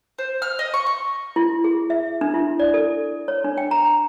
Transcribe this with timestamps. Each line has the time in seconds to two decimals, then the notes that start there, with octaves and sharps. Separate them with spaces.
0.18 C5
0.42 F6
0.59 D#5
0.74 C#6
0.87 C#6
1.36 E4
1.64 G#4
1.90 E5
2.21 D4
2.34 E4
2.60 D5
2.74 A4
3.28 C#5
3.44 D4
3.58 G5
3.71 A#5